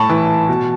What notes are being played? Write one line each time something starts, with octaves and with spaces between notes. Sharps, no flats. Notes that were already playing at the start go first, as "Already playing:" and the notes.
Already playing: A2 A5 B5 C#6
E3
B2